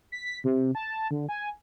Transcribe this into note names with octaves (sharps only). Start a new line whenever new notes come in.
B6
C3
A5
D3
G#5